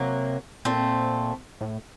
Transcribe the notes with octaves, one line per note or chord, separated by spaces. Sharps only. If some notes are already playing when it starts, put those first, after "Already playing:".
Already playing: C3 F#3 A#3
A#2 A3 C4
A2